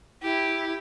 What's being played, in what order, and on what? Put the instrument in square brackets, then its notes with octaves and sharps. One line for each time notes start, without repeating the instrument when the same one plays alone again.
[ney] E4 [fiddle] G4